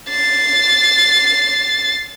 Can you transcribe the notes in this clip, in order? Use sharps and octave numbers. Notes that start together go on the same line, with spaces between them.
A6 C7